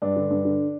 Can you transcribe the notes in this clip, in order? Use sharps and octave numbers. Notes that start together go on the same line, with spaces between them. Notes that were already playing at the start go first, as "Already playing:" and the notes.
G2 D4
D3
G2
D3